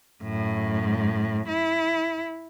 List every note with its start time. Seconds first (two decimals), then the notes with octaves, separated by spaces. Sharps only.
0.22 F#2 A2
1.48 E4